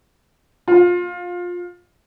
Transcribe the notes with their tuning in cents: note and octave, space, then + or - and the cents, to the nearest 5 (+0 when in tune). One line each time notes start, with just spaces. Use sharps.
F4 +20